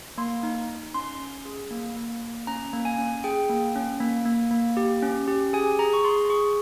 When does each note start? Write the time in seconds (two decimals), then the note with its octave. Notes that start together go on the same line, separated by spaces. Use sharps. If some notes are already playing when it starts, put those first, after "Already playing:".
0.18 A#3 C6
0.43 D#4
0.69 D#4
0.94 C#4 C6
1.20 C#4
1.45 G#4
1.71 A#3
1.96 A#3
2.22 A#3
2.47 C#4 A#5
2.73 A#3
2.85 G#5
2.98 C#4
3.24 G#4 G5
3.49 A#3
3.75 C#4
4.00 A#3
4.25 A#3
4.51 A#3
4.77 G4
5.02 C#4
5.28 G4
5.53 G#4 G#5
5.79 G#4 A#5
5.94 C#6
6.04 G#4 C6
6.30 G#4 C#6